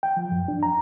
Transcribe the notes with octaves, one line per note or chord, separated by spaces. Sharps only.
G5
F3
F#2
D4
A#5